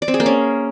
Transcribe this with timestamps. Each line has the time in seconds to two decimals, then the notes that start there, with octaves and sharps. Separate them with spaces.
0.02 D5
0.08 C4
0.14 G#4
0.20 A#3
0.26 C#4